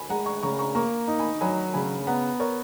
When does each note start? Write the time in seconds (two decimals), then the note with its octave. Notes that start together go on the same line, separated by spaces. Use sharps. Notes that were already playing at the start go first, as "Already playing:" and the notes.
Already playing: G#5 B5
0.09 G#3 F#5 A#5
0.26 A#5 C#6
0.43 C#3 A#5 C#6
0.59 A#5 C#6
0.75 A#3 A#5 C#6
1.08 D#4
1.19 G#5 B5
1.41 F#3 G#5 B5
1.74 C#3 G#5 B5
2.07 B3 F#5 A#5
2.40 A#4 C#5